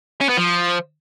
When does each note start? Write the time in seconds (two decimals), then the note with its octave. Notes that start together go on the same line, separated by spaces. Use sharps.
0.21 C#4
0.29 B3
0.37 F3